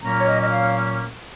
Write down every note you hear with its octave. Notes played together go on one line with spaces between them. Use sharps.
A#2 F#3 A#3 C#4 A#5
C#5
D#5
D#5
F5